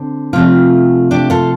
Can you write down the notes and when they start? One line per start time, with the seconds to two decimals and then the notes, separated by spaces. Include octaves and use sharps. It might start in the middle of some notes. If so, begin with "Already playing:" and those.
Already playing: D3 C4
0.33 C3 F3 A3 F4
1.11 D4 G4
1.30 F4 A4